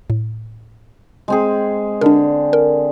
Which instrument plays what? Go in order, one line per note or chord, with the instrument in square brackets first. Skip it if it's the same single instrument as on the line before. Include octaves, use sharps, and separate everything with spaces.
[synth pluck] A2
[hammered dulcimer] G#3 C4 G#4
[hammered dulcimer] D3 [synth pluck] D4 A#4
[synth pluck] A#4